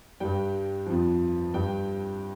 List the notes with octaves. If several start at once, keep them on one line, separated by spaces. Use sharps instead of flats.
G2 G3 G5
F2 F3
G2 G3 G5